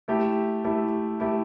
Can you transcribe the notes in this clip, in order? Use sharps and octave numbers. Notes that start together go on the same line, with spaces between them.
A3 E4 G4
A3 E4 G4
A3 E4 G4